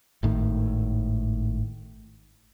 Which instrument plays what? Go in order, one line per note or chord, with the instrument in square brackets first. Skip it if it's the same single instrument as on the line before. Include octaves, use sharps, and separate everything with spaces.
[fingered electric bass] G#1 A2 D#3